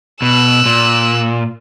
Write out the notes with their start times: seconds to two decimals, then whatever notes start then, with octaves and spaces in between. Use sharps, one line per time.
0.22 B2 E6 F#6
0.66 A#2